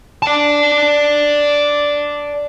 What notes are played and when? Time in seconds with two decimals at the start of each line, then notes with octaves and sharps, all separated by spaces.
0.23 D5 A5